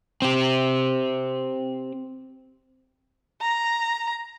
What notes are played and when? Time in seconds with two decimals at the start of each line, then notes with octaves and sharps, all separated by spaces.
0.22 C4 G4
3.41 A#5